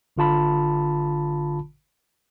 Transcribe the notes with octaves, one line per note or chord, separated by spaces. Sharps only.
G#1 D3 F4 A5 B5